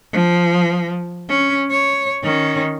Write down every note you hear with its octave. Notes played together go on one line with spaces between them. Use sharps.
F3
C#4
C#5
D#3 C#4